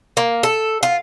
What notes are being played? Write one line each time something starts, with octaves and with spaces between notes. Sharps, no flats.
A#3
A4
F4